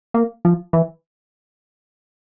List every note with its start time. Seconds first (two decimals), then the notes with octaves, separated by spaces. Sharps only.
0.14 A#3
0.45 F3
0.73 E3